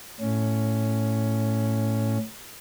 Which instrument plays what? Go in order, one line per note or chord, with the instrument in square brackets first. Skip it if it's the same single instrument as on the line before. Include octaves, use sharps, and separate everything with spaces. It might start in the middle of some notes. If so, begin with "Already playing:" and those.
[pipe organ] A2 C#4